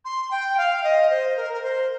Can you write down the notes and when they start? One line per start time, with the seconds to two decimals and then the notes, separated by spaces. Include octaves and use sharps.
0.04 C6
0.31 G5
0.57 F5
0.83 D#5
1.10 C5
1.36 A#4
1.53 A#4
1.62 C5